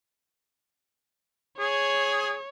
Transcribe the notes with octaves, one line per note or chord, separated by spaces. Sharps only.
G#4 C#5